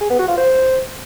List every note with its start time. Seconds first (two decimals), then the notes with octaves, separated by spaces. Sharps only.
0.01 G#4
0.10 B3
0.19 F#4
0.28 F4
0.37 C5